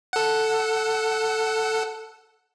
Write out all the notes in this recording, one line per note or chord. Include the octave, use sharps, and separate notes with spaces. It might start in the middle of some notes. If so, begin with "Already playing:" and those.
A4 F#5